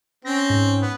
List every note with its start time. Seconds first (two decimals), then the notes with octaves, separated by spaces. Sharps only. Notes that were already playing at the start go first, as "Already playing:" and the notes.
0.25 C4 C#4 A#6
0.50 G#2
0.81 B3